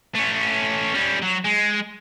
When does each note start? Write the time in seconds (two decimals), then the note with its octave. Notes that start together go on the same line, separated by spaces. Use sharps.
0.15 A3 C#4
0.94 G3 C#4
1.22 F#3
1.44 G#3